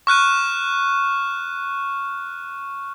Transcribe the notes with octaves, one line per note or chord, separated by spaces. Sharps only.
C#6 F6 F#6 D#7